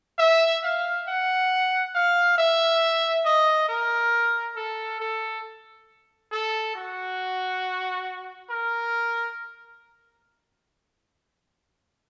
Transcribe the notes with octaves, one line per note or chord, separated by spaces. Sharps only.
E5
F5
F#5
F5
E5
D#5
A#4
A4
A4
A4
F#4
A#4